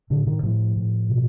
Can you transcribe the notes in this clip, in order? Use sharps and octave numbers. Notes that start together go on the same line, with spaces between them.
A2 D3
D#3
A2 F3
A2
B2